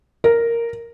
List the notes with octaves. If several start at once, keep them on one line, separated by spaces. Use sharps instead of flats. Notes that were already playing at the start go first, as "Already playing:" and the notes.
A#4